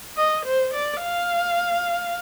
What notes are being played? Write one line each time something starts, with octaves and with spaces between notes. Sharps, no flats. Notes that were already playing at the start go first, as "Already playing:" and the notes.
D#5
C5
D5
F5